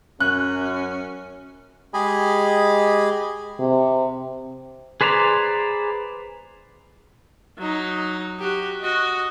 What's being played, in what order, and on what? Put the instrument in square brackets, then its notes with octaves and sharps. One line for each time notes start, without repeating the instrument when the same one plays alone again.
[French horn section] F#2 [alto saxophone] C#4 [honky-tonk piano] F#6
[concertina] G#3 G4 G#4 D#5 G#5 B5
[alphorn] C3
[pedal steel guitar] G#4 B4 C5 D5 A#5
[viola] F#3 D#4
F#4 G4
F#4 D#5